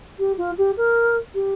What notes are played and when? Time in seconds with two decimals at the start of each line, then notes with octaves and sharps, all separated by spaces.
0.19 G4
0.38 F4
0.58 G4
0.77 A#4
1.34 G4